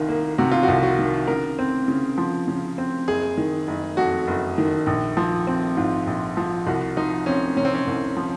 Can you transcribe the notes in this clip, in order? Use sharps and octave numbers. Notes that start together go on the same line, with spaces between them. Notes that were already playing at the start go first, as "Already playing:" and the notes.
Already playing: C2 D#3 F4
A#3
C3 F#4
F4
F#4
C2
F#4
D#3
C#3 A#4
C4
C#3
F3
C#3
C4
F#1 G#4
D#3
F#1
F2 F#4
F#1
D#3
A#1
F3
C4
G#2 F4
A#1
F3
C2 F#4
F3 D#4
C4 C#4
C3 C#4
C4
C#4
C2
F3